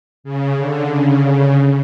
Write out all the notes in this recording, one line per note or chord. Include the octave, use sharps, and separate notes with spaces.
C#3
D3
C#3
C#3